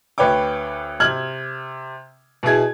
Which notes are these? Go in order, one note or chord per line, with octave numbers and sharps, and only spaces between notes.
D2 B4 C#5 G5 D6
C3 F6 G#6 F#7
B2 E4 G#4 G#6